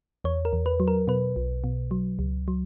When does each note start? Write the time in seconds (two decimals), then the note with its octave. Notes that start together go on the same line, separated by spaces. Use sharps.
0.24 E2 C#5
0.45 A#4
0.53 E2
0.66 B4
0.80 F#3
0.88 A#4
1.08 B2 B4
1.36 B1
1.64 B2
1.91 F#3
2.19 C#2
2.48 F#3